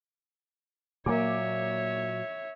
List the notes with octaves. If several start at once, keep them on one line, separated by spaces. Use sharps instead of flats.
A#2 F#3 A#3 C#5 E5 D6